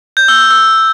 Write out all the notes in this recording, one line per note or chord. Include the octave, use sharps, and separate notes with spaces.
G6
E6
E6
E6